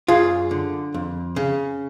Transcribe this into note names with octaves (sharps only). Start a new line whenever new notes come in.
F#2 F4 G#4
D3
F2
C#3